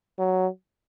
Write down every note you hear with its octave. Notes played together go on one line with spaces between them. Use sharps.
F#3